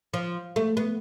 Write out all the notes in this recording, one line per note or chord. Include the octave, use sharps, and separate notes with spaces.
F3
A3
B3